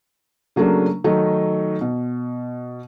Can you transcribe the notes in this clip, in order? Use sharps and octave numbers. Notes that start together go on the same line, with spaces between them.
C#3 F#3 A3 A#3 D4
D#3 F#3 A3 D#4
B2